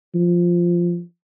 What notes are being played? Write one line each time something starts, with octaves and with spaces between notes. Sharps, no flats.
F3